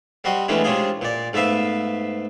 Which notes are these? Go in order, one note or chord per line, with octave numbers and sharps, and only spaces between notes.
G3 C4 F#4 D#5
E2 E3 G#3 A3 C#4 D4
C3 G#3 C#4 D4 F4 G#4
A#2 D5
G#2 A3 B3 E5 F5